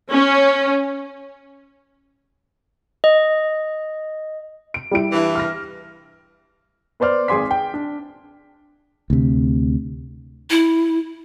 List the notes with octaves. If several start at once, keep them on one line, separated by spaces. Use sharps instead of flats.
C#4
D#5
D7
G3 E4 D7
G2 E3
F6 A#6
B3 B4 C5 D5 F6
G#1 G#4 G#5 C6 D6 B6
G5
D4
D2 C3
E4